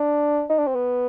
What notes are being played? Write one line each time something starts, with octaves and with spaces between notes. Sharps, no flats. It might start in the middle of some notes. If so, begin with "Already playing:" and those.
Already playing: D4
D#4
D4
C4
B3